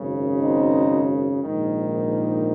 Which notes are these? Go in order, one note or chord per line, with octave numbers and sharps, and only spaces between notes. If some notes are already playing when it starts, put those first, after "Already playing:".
Already playing: G#1 F#2 C#3
C4 D#4
A#1 G#2 D#3